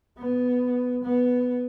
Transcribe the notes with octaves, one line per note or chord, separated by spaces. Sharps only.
B3
B3